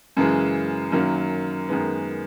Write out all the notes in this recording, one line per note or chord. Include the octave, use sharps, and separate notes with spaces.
F#2 C#3 E3 G#3
F#2 D#3 F#3 A#3 C#4
F#2 D#3 G#3 B3